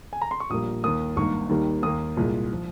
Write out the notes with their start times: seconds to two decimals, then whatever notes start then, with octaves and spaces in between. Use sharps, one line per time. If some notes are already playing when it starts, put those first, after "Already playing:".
0.13 G#5
0.22 A#5
0.31 C6
0.40 C#6
0.50 A#1 A#2 G3 A#3 D#6
0.83 D#2 D#3 A#3 D#6
1.17 G#1 G2 D#3 A#3 C#6
1.49 D#2 D#3 G3 A#3
1.83 D#2 D#3 A#3 D#6
2.17 C2 A#2 G#3
2.53 F3